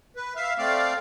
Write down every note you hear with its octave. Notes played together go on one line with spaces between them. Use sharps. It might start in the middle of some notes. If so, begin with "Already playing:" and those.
B4
E5 F5
A3 C4 D5 F5